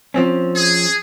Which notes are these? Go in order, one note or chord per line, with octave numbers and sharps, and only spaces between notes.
F3 C4 C#4
G#4